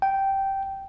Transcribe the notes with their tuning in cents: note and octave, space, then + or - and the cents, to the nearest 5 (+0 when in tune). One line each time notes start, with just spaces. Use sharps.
G5 -10